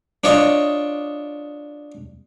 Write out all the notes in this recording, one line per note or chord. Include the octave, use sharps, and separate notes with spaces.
D4 F4 C#5 D#5